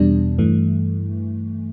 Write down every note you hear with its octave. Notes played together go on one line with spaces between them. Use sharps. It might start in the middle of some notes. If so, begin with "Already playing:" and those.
Already playing: E2 B2 G3 D4
G2 E3 A3